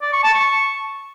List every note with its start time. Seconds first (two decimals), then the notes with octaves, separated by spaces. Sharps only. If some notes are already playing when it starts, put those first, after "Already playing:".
0.02 D5
0.13 C#6
0.23 A5
0.34 C#6